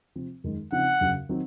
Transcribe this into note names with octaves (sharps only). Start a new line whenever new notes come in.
C3 F3 C4
F#2 D#3 G#3
C#3 F3 C4 D#4 F#5
F#2 C#3 F#3 C#4 F#4
D#3 F#3 C4 D#4